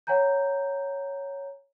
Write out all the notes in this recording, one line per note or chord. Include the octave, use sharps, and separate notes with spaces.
C#5 F#5 G#5 A#5 G6